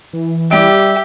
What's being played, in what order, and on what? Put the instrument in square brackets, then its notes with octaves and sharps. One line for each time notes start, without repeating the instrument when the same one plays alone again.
[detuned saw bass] E3
[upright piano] G3 D7 [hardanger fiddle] G4 [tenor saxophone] E5